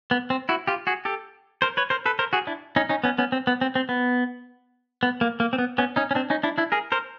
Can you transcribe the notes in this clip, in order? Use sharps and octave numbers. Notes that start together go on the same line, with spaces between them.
B3
C4
E4 F#4
F4 G4
F#4 G#4
G4 A4
A#4 C5
B4 C#5
A#4 C5
A4 B4
A#4 C5
F#4 G#4
D4 E4
C#4 D#4
C#4 D#4
B3 C#4
B3 C#4
C4
B3
C4
C4
B3
B3
A#3
A#3
C4
B3
B3 C#4
C#4 D#4
C#4
C4 D4
C#4 D#4
D4 E4
D4 E4
G#4 A#4
A#4 C5